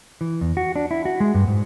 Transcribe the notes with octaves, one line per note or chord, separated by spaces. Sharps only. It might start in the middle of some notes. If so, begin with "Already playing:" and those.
E3
E2
F#4
D4
E4
F#4
G#3
G2
G#2